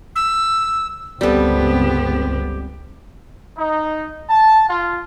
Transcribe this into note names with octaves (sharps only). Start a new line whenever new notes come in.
E6
G1 C#2 G3 B3 C4 G4 A4
D#4
A5
F4